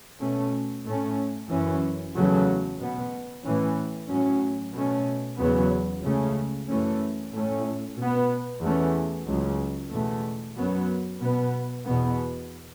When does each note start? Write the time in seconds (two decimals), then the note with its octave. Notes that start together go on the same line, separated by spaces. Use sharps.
0.20 B2 A3 C#4
0.86 A2 A3 C#4
1.50 F#2 E3 C#4
2.14 E2 C#3 F#3 A3
2.79 B2 B3
3.44 A2 E3 C#4
4.09 A2 F#3 C#4
4.73 B2 A3 C#4
5.38 E2 C#3 F#3 B3
6.04 C#2 C#3 A3 C#4
6.68 F#2 E3 A3 C#4
7.33 A2 A3 C#4
7.98 B2 B3
8.62 E2 E3 A3 C#4
9.27 C#2 C#3 F#3
9.91 E2 B2 A3
10.57 F#2 F#3 B3
11.21 B2 B3
11.85 E2 B2 B3